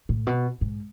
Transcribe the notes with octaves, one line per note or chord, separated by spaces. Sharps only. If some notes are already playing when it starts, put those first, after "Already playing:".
A2
B2
G#2